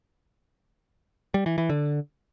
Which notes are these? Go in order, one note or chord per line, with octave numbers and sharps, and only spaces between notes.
G3
E3
E3
D3